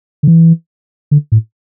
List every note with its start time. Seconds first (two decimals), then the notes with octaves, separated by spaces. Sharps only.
0.23 D3
0.27 E3
1.11 D3
1.32 A2